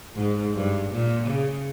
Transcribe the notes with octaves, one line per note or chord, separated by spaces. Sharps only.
G#2
G2
A#2
C#3